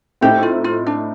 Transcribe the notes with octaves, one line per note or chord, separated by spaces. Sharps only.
A2 A3 C4 D#4 G4 A4
F4
F4
D4